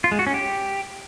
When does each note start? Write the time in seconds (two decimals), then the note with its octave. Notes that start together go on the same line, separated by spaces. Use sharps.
0.04 F4
0.12 G#3
0.19 F#4
0.27 C#4
0.34 G4